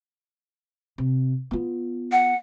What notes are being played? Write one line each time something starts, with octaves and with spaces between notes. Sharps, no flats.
C3
B3 F4
F#5